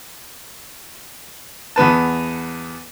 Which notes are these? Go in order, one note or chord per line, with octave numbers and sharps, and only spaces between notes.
E2 B3 B4 A5